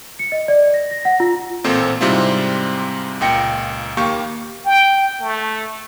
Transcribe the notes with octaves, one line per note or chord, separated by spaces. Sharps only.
C#7
D#5
D5
A#6
A#6
F#5
F4
A1 A#2 C4 A4 C5 C6
G#2 C3 G3 C4 E4 F4
C#2 A#2 G5 A#6 C#7
D#2 A#3 G4 F5 C#6 G6
G5
A3